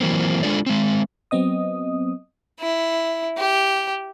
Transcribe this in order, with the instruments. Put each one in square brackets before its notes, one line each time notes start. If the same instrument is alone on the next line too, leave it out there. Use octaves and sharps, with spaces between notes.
[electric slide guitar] E3 F#3 A#3 C4
G#3 D4 F4 A4 D5
G#3 C4
[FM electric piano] F#3 B3 C4 D#5 D#6
[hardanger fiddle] E4
G4